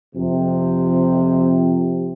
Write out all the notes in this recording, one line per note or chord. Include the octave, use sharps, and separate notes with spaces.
F2 C3